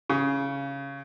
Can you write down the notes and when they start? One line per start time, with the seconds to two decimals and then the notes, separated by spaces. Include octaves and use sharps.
0.10 C#3